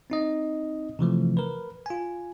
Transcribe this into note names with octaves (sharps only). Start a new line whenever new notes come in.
C4 D#4 D#5
C3 E3 F3 A3
A#4 B4
F4 G#5